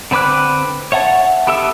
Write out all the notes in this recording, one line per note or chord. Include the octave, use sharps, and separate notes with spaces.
D3 C4 B4 D6 F#6
C#5 E5 F#5 A5
B3 G4 A4 E5 E6